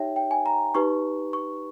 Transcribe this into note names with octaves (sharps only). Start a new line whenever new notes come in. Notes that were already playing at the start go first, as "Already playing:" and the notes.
Already playing: D#4 G4 C#5 E5 G5
G5
G#5
A#5
D#4 G4 B4 C#6
C#6